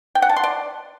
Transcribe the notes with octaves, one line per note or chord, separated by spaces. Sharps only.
G5
F#5
A5
C6
D5